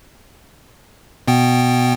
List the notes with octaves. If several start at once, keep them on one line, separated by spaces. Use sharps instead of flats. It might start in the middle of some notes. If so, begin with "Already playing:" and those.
B2 B3 G5